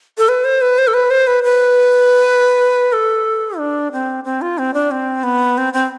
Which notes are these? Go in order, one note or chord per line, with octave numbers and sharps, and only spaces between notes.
A4
B4
C5
B4
C5
A4
B4
C5
B4
B4
A4
D4
C4
C4
F4
C4
D4
C4
B3
C4
C4